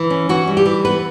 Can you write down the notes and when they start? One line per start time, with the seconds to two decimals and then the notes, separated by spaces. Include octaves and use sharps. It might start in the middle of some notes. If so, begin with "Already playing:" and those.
Already playing: E3
0.10 C#4
0.29 E3 F#4
0.48 G3
0.57 G4
0.66 E3
0.85 B3 B4